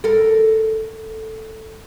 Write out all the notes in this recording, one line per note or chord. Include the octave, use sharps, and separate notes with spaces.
A4 A#4